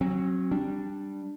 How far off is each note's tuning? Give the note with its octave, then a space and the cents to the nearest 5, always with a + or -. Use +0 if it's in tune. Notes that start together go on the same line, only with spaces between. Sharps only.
F#3 +0 C4 +45
G3 +0 D4 +0